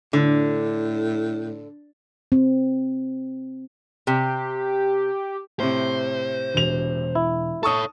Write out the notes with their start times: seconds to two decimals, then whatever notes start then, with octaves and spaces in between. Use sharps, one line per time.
0.13 A2 D3
2.32 C4
4.07 C3 G4
5.60 A2 C3 C5
6.54 E1 F7
7.15 E4
7.63 A4 C#5 A5 C#6 D#6